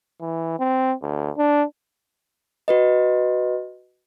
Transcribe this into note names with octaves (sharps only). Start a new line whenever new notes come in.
E3
C4
D2
D4
F#4 B4 D#5